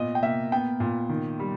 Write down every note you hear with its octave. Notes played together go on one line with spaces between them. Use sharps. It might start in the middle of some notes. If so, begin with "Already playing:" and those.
Already playing: A#2 B3 D#5
G5
A#3 E5
B3 G5
A#2
D#3
G3